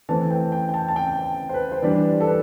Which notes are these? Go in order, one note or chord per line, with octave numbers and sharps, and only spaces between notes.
E3 A3 C4 A5
G5
G5
G5
A5
A5
G5
C5
B4
C5
E3 G3 D4 D5
A4
B4